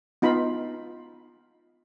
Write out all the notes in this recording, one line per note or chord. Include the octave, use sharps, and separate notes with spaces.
B3 D#4 F4 B5